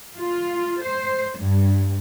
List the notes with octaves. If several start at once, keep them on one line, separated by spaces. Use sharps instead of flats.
F4
C5
G2